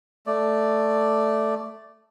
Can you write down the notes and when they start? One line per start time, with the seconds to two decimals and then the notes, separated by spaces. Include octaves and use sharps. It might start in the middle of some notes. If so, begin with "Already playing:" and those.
0.27 A3 D5